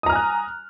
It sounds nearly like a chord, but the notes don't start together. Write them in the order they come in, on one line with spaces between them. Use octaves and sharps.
D#6 A#5 F6 G#5 F#6